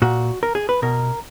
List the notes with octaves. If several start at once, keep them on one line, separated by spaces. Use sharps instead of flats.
A#2 F#4
A#4
G#4
B4
B2 A#4